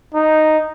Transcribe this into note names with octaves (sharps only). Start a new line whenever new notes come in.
D#4